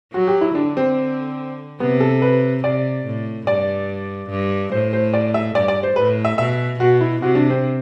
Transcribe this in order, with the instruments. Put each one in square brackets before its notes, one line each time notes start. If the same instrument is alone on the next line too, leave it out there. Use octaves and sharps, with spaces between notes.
[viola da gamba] F#3 [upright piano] F#4
[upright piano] G4
E4
[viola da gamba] D3 [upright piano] D4
[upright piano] C4
[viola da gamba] C3 [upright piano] B3
[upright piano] A4
B4
[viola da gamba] C3 [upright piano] D5
[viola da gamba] A2
[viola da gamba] G2 [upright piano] D5
[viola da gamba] G2
[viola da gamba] A2 [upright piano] C5
[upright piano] C5
D5
E5
[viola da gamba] G2 [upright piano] D5
[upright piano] D5
C5
[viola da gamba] A2 [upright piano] B4
[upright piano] E5
[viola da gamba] B2 [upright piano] E5
[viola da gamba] B2 [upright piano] F#4
[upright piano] E4
[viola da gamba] C3 [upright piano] F#4
[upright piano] D4
C4